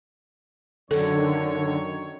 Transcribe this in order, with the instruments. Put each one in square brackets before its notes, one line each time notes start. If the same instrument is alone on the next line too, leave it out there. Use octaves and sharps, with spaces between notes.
[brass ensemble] F#2 D#3 C#5 [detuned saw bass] D3 [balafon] A4